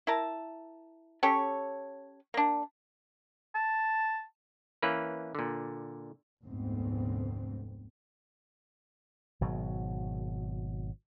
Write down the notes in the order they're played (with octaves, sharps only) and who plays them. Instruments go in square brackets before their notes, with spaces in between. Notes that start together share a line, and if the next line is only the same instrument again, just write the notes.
[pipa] E4 A#4 A5
C#4 G4 A4 C#5
A#3 D4
[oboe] A5
[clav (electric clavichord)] E3 A#3 C#4 B4
A#2 D3
[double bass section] F1 D2 G#2 B3 C4
[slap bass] G#1 B2 F#3